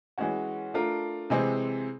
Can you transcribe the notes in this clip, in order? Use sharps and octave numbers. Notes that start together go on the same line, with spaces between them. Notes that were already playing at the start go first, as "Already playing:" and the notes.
E3 G#3 C#4 F#4
A3 D4 F4 A#4
C3 E3 G#3 C4